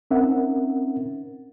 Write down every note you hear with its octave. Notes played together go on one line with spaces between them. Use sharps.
C4 C#4 D#4 A#4 E5 F#5